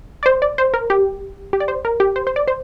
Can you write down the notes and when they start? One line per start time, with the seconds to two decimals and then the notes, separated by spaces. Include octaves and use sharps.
0.23 D5
0.26 C5
0.42 D5
0.58 C5
0.74 A#4
0.90 G4
1.53 G4
1.60 D5
1.68 C5
1.85 A#4
2.00 G4
2.16 C5
2.27 C5
2.36 D5
2.48 C5